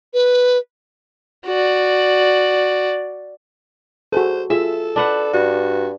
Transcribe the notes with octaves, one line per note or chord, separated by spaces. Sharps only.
B4
F#4 D5
F#4 G#4 A4 C5
F4 G#4 A4 E5
D4 B4 F#5
G2 F#4